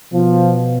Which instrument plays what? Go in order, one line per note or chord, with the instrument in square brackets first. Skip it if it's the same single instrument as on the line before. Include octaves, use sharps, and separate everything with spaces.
[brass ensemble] B2 F3